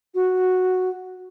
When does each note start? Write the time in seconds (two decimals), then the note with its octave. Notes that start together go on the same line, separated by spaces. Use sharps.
0.15 F#4